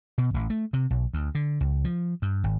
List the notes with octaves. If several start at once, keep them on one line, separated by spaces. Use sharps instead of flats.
B2
A1
A3
C3
B1
D2
D3
C#2
F3
G2
G#1